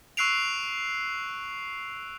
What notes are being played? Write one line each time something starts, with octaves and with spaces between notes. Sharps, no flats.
C#6 E6 F#6 C7 D7 F7